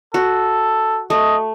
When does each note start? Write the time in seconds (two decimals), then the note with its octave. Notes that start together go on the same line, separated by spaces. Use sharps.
0.14 F#4 A4
1.10 A3 D#5